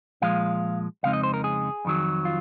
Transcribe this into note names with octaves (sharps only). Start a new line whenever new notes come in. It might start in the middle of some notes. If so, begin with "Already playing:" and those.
A#2 F3 G#3 F5
F2 C#3 G#3 C4 D#4 F5
D#5
C5
A#4
G#4
F2 D#3 F#3
F4